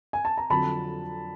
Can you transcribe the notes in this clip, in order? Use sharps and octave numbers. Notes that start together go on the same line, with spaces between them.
G#5
A5
A#5
F2 D3 F#3 A5 B5